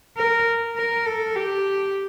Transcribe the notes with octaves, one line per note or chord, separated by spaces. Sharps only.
A#4
A#4
A4
G4